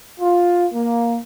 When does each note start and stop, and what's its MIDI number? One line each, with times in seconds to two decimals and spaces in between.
0.20 0.67 65
0.74 1.17 58